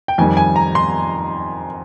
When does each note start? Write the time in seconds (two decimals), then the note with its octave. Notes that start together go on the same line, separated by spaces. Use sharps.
0.08 G5
0.18 F2 D#3 G3 G#5
0.37 G#5
0.56 A#5
0.75 C6